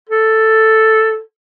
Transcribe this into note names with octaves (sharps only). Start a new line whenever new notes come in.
A4